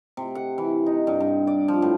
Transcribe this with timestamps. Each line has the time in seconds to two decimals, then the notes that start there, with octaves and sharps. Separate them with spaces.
0.17 C3
0.35 F#5
0.58 E3
0.86 D#4
1.07 G2
1.20 G2
1.47 D5
1.68 F3
1.82 A2